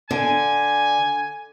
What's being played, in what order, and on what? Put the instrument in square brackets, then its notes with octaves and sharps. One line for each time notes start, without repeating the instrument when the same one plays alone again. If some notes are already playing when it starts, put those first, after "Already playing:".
[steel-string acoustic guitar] D3 [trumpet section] G#5